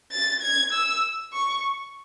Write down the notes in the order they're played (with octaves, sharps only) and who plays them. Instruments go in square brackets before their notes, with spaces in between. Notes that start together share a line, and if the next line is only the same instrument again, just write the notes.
[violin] A6
G#6
E6
C#6